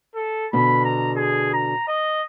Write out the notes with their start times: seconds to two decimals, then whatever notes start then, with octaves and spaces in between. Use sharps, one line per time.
0.15 A4
0.53 B2 D3 B5
0.84 A#5
1.16 G#4
1.53 A#5
1.88 D#5